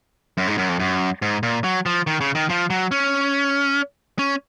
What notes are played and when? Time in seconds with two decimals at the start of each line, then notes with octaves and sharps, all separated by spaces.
0.37 F#2
0.48 G#2
0.58 F#2
0.69 F2
0.79 F#2
1.22 G#2
1.43 A#2
1.64 F#3
1.86 F3
2.07 D#3
2.21 C#3
2.35 D#3
2.49 F3
2.70 F#3
2.91 C#4
4.19 C#4